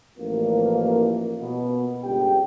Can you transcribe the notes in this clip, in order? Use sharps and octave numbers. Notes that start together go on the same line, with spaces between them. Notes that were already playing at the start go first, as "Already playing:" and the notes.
A1 F3 A#3
B2
G1 C#2 G4 G5